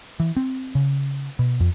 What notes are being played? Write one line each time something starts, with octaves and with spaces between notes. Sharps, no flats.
E3
C4
C#3
B2
F2